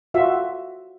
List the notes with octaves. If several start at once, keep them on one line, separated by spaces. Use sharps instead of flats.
F4 F#4 E5